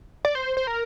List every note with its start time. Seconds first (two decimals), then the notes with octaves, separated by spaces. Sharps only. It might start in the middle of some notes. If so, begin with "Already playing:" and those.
0.25 D5
0.35 C5
0.57 C5
0.67 A#4